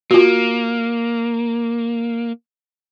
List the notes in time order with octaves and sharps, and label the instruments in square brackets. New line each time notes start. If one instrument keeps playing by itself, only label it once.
[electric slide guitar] A#3 [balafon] F4 F#4